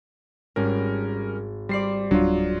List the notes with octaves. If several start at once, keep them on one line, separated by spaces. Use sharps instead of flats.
G#1 G3 C#4 A#4
G3 C5 D5 C7
D1 F#3 G3 D4 F4